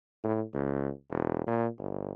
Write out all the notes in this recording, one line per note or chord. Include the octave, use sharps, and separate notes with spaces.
A2
C#2
E1
A#2
G1